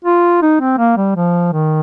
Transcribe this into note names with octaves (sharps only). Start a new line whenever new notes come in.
F4
D#4
C4
A#3
G3
F3
D#3